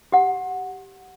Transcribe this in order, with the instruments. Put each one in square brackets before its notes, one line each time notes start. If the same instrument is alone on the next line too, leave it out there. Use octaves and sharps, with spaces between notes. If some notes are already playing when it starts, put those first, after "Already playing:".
[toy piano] G4 F#5